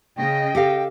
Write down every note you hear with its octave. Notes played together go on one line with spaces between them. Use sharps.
C#3 D#5 G5
G4 A4 F5